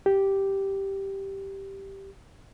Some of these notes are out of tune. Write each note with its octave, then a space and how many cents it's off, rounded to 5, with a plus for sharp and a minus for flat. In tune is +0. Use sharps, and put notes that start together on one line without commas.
G4 -5